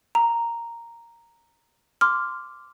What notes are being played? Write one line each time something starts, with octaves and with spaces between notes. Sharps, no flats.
A#5
C6 D6 F6